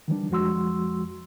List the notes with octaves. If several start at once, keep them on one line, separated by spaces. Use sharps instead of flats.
D#3 E3 G3 D4
F2 F3 G#3 F#4 C6 E6